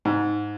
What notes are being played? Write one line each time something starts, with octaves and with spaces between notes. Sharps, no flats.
G#2